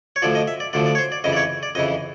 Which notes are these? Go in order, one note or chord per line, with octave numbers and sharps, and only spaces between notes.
C#5
D2 D3 F3 D5
D#5
E5
D5
D2 D3 F3 D5
D5
C#5
C5
D5
F2 C#3 E3 D#5
D5
C#5
D5
F2 C#3 E3 D#5